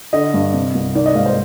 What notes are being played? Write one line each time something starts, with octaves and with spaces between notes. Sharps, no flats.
D3 D#5
G2
C3
C2
D#3 D5
D#5
G#2 F5
C5